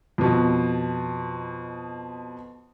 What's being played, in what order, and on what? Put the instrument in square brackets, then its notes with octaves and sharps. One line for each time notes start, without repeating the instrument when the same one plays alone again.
[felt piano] F2 B2